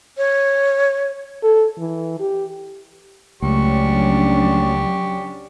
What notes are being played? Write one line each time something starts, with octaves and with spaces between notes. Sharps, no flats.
C#5
A4
E3
G4
C#2 F#3 A3 C#4 D4 G4 C#6